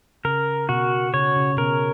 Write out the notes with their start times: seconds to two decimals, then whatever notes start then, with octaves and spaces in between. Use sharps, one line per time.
0.25 C#3 A#4
0.69 B2 F#4
1.14 C#3 C#5
1.36 C#3
1.57 B2 A#4